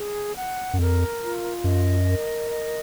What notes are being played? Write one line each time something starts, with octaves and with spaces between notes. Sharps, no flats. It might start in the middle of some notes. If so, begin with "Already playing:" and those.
Already playing: G#4
F#5
F#2
F2 A#4
F4
F#2 D#5
A#4
D#5